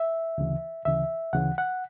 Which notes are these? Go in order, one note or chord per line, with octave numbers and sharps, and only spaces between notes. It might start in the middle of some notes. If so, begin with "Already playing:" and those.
Already playing: E5
D2 C#3 E3
D2 C#3 E3 E5
D2 C#3 E3 F#5
F#5